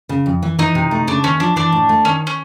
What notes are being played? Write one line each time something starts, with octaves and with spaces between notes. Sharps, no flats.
C#3
F2
E3
E3 D#4
C3
A3
C#3 D4
D#2 C#4
F3 D4
E3 D4
A2
A3
D#3 C#4
C#4